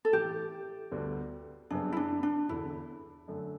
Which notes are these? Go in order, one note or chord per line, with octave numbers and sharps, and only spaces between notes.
A4
A2 E3 A3 G4
D2 D3 G3 B3
F#2 C#3 G3 B3 D4
E4
D4
D4
E1 E2 D3 E4
F#2 D3 A3